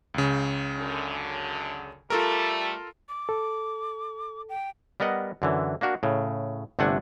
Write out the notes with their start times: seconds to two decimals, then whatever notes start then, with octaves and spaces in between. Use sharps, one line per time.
0.14 C#2 C#3
0.78 F#2 D3
2.10 G3 A3 F4 A4 A#4
3.08 D6
3.29 A4
4.49 G5
5.00 G3 B3 A#4 D#5 F#5
5.42 F#2 D3 E3
5.81 A#3 D4 F#4 A#4
6.03 A2 C#3
6.79 G1 C3 A3 D4 F#5 G#5